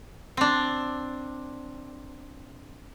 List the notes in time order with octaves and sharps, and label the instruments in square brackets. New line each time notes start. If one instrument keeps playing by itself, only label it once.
[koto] C4 D4